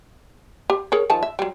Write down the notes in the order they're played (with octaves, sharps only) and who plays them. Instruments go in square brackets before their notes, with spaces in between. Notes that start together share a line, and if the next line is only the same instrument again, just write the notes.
[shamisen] G4
G#4 A#4 C#5
D#3 F3 A5
E5
F#3 G3